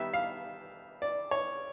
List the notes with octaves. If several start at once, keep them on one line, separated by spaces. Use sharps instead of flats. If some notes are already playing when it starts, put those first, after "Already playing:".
Already playing: D#3 G3 B3 E5
F5
D5
C#5